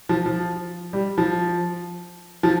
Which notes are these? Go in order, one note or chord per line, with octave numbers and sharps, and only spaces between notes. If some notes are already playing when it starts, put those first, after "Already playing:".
F3
F3
G3
F3
F3